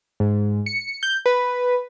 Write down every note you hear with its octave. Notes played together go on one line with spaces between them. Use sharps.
G#2
C#7
G6
B4